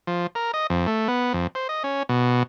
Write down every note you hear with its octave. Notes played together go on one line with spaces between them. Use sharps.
F3
A#4
D#5
F2
A3
B3
F2
C5
D#5
C#4
B2